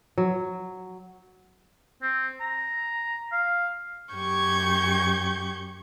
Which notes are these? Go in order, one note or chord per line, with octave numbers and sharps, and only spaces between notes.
F#3
C4
A#5
F5
F#2 G4 C#6 G6 G#6